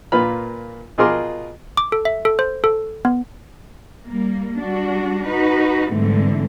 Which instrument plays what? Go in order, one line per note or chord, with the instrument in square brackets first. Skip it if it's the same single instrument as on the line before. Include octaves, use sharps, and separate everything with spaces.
[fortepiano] A#2 A#3 F4 B4 B5 F6
B2 F4 G#4 A#4 C6 D6
[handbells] D6
A4
E5
A4
C5
A4
B3
[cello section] G3 A#3
G3 D4 F#4
D#4 F#4 B4
G#2 D3 E3 G3 A3 C4